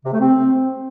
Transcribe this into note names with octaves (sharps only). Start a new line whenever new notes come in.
C3
A3
C4